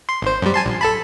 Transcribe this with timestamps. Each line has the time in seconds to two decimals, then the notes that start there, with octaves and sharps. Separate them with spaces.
0.09 C6
0.22 G#1 C5
0.42 F#2 G3
0.54 G#5 A5 C6
0.66 A#1
0.81 A4 A5 B5